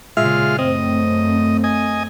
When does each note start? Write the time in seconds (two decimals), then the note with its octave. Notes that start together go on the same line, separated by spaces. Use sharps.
0.17 A#2 C#3 G#3 F4 E5 F6
0.59 F#2 A3 C4 D#5
1.64 D#5 G#5